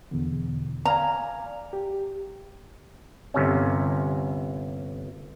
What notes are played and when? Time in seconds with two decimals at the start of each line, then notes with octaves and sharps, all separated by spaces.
0.11 E2 B2 D3
0.85 D5 F5 G#5 A#5
1.73 G4
3.34 G1 C3 C#4